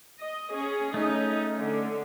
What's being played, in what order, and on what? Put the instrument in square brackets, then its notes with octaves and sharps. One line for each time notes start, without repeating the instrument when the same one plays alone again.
[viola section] D#5
C#4 G#4
[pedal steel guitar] A3 C#4 [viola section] D#4
[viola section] D3